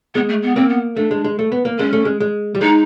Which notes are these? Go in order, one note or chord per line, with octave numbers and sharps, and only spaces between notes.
G#3 B3
A3
B3
A#3 C4
B3
A3 D4
G#3
G#3
A3
B3
A#3
G#3 C#4
A3
G#3
G#3
G3
G#3 D#4